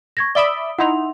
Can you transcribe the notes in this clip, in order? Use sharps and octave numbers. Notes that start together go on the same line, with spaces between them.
C#6 G#6 A#6
D5 E5 B5 D#6 D7 G7
D#4 E4 F#5 C6 F7